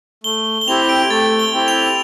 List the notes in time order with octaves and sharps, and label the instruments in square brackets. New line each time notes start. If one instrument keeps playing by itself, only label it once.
[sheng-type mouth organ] A3 [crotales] G7
[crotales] G7
[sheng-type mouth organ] C4 E4 G4 [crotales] F7
[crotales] D7
[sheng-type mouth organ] A3 [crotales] A6
[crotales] G7
[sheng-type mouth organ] C4 E4 G4
[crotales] F7